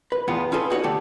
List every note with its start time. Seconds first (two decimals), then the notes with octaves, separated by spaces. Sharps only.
0.12 B4
0.28 E2 A2 B3 F4 F#5 G5
0.52 C#4 F4 G#4 A4 B4
0.70 D#4 F#4 C5 C#5
0.84 D3 A3 G4 A4